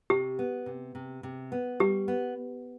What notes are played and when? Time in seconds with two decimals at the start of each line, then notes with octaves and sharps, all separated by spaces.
0.10 C3 G4
0.39 B3
0.66 C3
0.95 C3
1.23 C3
1.52 B3
1.80 G3 G4
2.08 B3